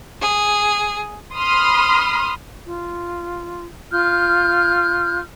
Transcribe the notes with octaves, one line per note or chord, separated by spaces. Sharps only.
G#4
B5 C6 D#6 F6
F4
F4 F6 G6